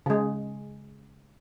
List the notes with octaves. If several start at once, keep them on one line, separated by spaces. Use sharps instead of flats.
C#3 G#3